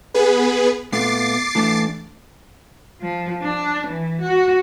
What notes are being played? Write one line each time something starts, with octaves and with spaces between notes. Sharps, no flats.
B3 G#4 B4
A#2 A3 B3 D6 A6 C7
E3 A3 D4
F3
D4
E3
F#4